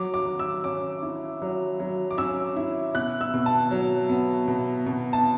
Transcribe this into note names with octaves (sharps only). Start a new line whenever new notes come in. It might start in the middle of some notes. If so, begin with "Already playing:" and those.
Already playing: F#3 D6
D6
F#3
E6
C#4 D6
E4
F#3
F#3
D6
C#4 E6
E4
B2 F#6
E6
B2
A5
F#3
B3
B2
B2
A5